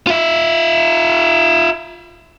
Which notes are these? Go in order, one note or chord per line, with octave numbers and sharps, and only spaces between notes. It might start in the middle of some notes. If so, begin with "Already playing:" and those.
F4 E5